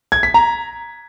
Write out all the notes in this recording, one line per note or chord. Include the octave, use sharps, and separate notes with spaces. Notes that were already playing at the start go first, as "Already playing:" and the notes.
G#6
B6
A#5